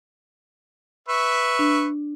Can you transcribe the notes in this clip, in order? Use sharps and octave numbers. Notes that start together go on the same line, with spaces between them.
B4 E5 C#6
D4